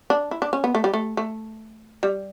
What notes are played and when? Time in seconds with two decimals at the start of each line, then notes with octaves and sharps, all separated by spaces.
0.10 D4
0.31 E4
0.42 D4
0.53 C#4
0.64 B3
0.75 A3
0.84 G3
0.94 A3
1.17 A3
2.03 G3